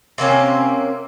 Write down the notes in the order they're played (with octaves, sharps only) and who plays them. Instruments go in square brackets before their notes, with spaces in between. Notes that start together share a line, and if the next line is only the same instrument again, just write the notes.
[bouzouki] C3 A#3 C4 C#4